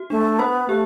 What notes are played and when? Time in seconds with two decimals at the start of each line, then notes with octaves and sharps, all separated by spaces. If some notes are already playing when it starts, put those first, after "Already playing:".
Already playing: F#4
0.10 A3 D4
0.39 B3 C5
0.68 A3 G4